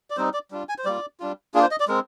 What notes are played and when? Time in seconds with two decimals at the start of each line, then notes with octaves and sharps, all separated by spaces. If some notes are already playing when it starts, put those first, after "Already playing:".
0.10 D5
0.17 G3 C4 D#4 C5
0.34 D5
0.51 G3 D4 F4
0.69 G#5
0.78 C5
0.85 G3 A#3 F4 D5
1.20 G3 D4 F4
1.54 A#3 D4 F4 G#4
1.63 C5
1.71 D#5
1.80 D5
1.88 G#3 C4 A#4